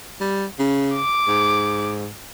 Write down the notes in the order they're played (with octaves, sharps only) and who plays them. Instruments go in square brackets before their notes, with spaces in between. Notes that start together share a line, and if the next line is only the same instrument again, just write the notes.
[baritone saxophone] G3
C#3
[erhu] D6
[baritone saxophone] G#2